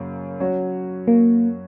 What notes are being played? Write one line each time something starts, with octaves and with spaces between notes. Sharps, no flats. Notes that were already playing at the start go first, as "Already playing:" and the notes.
Already playing: F#2 C#3 F#3 A#3
F#3 C#4 F#4 C#5
A#3